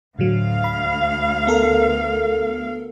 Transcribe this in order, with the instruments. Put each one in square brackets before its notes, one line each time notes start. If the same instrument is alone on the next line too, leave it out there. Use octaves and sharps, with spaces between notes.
[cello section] D2 F5 [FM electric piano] A2 D3 F#3
[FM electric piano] B5
B3 A4 A#4